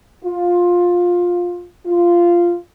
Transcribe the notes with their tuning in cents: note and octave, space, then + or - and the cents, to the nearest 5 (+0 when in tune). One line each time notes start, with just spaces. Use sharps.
F4 +15
F4 -10